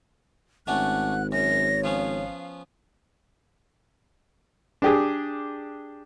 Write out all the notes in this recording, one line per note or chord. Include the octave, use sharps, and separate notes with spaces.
G#1 A3 C#4 D4 F#5 F#6
F#2 C#5 A#6
F3 B3 C#4 F5
D4 G4 G#4